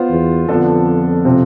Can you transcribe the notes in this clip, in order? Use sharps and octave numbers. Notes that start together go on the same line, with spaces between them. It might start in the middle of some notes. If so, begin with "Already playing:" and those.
Already playing: B3 F4 C5
E2
F2 D3 F3 B3 D4 A4
C3 F3 C4 F4